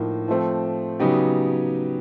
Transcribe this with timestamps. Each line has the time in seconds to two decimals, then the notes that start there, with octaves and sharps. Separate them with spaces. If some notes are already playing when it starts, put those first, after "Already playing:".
Already playing: A2 F3 A#3 D#4
0.28 F3 A3 C4
0.99 C#3 F#3 B3 D#4 G4